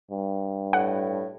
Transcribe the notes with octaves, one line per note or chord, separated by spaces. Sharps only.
G2
A2 F#5